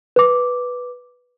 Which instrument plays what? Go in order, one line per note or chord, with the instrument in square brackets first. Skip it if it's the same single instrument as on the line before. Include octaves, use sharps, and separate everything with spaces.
[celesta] B4 D6